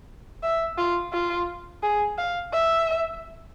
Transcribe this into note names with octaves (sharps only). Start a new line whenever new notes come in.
E5
F4
F4
G#4
F5
E5